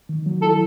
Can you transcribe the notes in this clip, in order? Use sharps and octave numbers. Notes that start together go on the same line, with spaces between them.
D#3
F#3
E4 A4